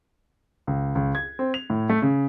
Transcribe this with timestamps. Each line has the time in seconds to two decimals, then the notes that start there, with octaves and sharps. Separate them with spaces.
0.67 C#2
0.95 C#2
1.15 G#6
1.39 C4
1.54 F7
1.70 A2
1.90 A3
2.02 C#3